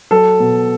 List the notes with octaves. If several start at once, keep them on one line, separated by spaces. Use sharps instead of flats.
F#3 A4
B2